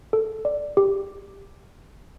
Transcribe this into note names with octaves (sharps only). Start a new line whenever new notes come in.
A4
D5
G4